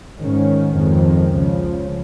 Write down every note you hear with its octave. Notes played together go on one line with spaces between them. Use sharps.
G#2 D#3 C#4
F2 D#3 G#3
C#2 C#3 F3